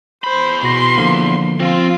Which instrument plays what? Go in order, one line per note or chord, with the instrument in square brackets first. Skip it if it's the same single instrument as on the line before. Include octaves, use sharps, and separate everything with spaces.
[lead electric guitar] E2 B5 [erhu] C5
[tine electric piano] B2 F#4 A#6 [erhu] C6
[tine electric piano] D3 F3 A#3
[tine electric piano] F3 [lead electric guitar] C4 [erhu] F4